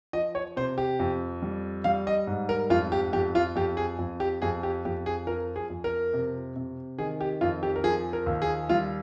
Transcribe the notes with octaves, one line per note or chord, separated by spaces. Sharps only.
F3 D#5
C#5
C3 C5
G4
F2
G3
G3 F5
D#5
G#2
A#4
F2 F4
G4
F2 G4
F4
F2 G4
G#4
F2
G4
F2 G#4
G4
F2 G4
G#4
F3 A#4
G#4
F2
A#4
C3
C3
D#3 G#4
G4
F2 F4
G4
A#4
F3 G#4
A#4
D#2
G#4
G3 F4